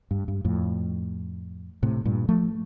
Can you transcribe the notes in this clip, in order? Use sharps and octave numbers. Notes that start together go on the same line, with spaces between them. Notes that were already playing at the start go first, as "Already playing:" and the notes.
G2
G2
F2 A2
A2 C3
G2 A#2
F3 A3